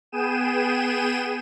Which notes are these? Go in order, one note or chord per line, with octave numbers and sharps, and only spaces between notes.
B3 G#4 G5 D#7 E7